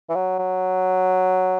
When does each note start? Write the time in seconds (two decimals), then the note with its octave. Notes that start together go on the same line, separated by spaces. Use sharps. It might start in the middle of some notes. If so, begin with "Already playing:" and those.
0.10 E3
0.15 F#3
0.39 F#3